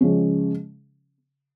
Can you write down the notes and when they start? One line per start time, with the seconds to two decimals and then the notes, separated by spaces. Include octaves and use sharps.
0.01 C#3 F3 G#3 C#4